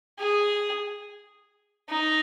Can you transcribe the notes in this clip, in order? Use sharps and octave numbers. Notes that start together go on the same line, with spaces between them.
G#4
D#4